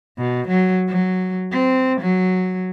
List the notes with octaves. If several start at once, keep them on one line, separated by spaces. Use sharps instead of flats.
B2
F#3
F#3
C4
F#3